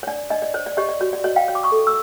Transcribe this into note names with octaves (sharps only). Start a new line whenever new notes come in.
C#5
D4 D5
D4 D#5
D5
C5 C#5
D5
G4 C#5 D#5
D5
F#4 C#5
D5
F#4 C#5 D#5
F5 G5
C#5
D6
C#6 D#6
A4
E6